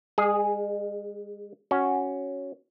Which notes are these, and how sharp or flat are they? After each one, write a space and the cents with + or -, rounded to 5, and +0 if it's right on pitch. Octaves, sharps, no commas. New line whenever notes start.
G#3 -35 G#4 +0
C#4 +0 F#4 +0